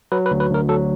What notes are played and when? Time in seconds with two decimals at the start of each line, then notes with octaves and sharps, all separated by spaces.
0.12 F#3 B4
0.26 B4
0.31 D2
0.40 B4
0.50 D2 A#4
0.69 F#3 A4